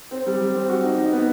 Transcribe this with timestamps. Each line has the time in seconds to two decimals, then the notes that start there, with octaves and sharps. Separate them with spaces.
0.11 C4
0.26 G3
0.41 G3
0.55 C4
0.69 F#4
0.84 D#4
0.98 D#4
1.13 B3